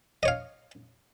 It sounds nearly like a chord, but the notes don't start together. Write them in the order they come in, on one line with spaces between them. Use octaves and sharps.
D#5 C#5 F5